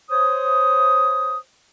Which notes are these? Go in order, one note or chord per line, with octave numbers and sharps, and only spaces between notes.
C5 C#5 D#6